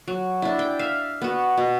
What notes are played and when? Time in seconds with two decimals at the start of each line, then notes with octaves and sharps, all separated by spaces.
0.08 F#3
0.42 D4 E4
0.59 G5
0.79 E5 F5
1.22 B3 F#4
1.57 B2